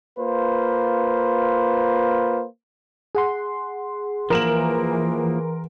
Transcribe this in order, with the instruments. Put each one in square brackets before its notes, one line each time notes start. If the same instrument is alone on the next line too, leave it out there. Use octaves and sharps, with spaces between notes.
[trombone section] A#3 F4 B4 C5
[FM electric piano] G#4 F#5 C6
[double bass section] E3 [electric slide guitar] F3 A#3 [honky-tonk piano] A#4 E7 F#7